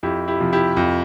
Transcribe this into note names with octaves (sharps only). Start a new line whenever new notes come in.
F2 E4 G4
E4 G4
C3 F3
E4 G4
F2